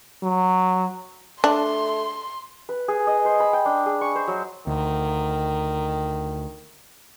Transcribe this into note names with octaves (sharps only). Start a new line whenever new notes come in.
F#3
A3 D4 C6
B4
G#4
D#5
C5
B5
G5
D4
G#4
C#6
C5
F#3
D2 D#3